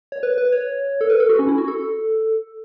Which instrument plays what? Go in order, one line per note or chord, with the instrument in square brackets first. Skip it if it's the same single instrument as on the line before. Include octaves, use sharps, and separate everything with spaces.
[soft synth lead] C#5
B4
B4
C#5
A4
B4
A4
F#4
C#4
E4
F#4
A4